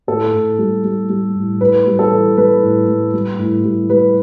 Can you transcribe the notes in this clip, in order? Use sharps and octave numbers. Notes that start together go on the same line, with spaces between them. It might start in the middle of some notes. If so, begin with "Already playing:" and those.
A2 A4
A2
G3
G3
G3
A2
A2 B4
G3
A4
E3
G3 B4
A2
G3
G3
A2
G3
G3 B4